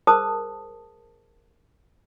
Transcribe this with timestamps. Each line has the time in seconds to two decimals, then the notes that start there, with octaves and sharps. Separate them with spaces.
0.07 G#4 A#4 C5 A5 D#6